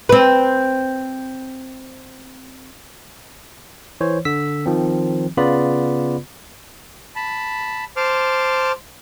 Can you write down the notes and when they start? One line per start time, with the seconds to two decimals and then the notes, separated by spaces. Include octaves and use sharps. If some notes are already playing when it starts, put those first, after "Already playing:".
0.09 C4 B4
4.01 E3 C5 C#5
4.25 D3 E6 B6
4.66 D#3 F3 C4
5.37 C#3 B3 F4 B4 D5 B5
7.16 A5 B5
7.97 C5 A5 C6 D6 F6